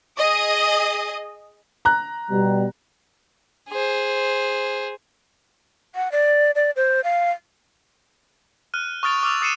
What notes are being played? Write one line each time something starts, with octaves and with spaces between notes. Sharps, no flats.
G#4 D#5 D#6
A#5 F#6
B2 G3
G#4 C5
F#5
D5
D5
C5
F5
F6 F#6 D#7
C#6 D#6 F6 A6 D7 F7
D6 E6 F6 F7
D#6 A6 C7 C#7 D#7 E7